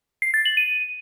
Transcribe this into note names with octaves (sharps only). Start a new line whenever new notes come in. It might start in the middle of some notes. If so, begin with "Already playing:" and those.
C7
A6
F#7
D#7